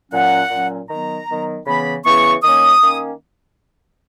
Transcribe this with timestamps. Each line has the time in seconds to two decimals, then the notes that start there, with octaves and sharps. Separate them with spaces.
0.11 A#2 F#3 C#4 F#5
0.49 A#2 F#3 C#4
0.88 D#3 F#3 B3 A#5
1.27 D#3 F#3 B3
1.65 C#3 E3 B3 B5
2.04 C#3 E3 B3 C#6
2.42 D#3 A#3 C#4 D#6
2.81 D#3 A#3 C#4